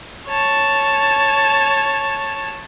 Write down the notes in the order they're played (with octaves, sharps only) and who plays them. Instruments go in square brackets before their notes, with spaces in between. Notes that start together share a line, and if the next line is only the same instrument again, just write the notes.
[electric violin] C#5 A5